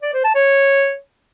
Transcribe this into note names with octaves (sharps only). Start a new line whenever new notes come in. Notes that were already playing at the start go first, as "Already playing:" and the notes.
D5
C5
A5
C#5